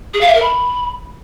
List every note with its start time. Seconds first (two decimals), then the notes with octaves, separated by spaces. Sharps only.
0.14 G#4
0.21 F5
0.28 E5
0.35 A#4
0.42 B5